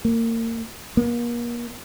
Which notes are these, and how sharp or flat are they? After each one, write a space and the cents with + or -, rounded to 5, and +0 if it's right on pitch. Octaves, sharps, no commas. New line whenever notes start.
A#3 -30
A#3 +35